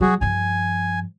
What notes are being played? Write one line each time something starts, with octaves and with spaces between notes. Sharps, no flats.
F#3 F#4 G#4
G2 F3 G#5